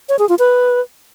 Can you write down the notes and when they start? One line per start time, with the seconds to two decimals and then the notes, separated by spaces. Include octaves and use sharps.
0.09 C#5
0.19 G#4
0.29 F4
0.39 B4